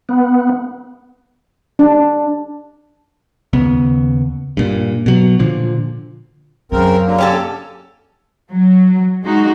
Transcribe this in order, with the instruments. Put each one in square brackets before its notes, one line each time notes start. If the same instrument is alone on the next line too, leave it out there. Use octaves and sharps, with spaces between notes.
[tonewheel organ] B3
[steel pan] D4
[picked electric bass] D#2 C#3 B3
G2 A#2
B2 F#3
A#2 D3 F3
[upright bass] F#2 [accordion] C#3 C4 A#4
[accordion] D3 F#3 A#3
[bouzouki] C#4 G4 A4
[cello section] F#3
G#3 D#4 F#4